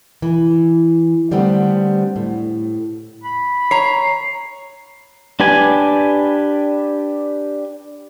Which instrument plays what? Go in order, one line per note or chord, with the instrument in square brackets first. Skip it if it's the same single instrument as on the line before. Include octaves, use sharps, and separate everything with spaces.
[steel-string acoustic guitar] E3
D3 G3 A3 B3 C4
A2
[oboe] B5
[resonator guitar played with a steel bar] C#5 [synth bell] A#5 C7
[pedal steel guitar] D4 G4 B4 G#5